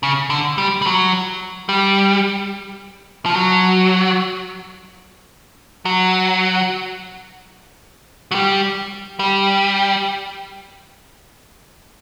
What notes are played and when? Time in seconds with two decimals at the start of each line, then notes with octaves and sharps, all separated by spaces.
0.03 C#3
0.30 D3
0.58 G3
0.82 G3
0.86 F#3
1.69 G3
3.26 F3
3.36 F#3
5.85 F#3
8.31 F#3
8.35 G3
9.19 G3